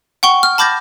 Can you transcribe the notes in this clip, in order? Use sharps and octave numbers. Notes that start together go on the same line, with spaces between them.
F#5 G5 C#6 G7
F6
A5 B5 D6 G6 A6 A#6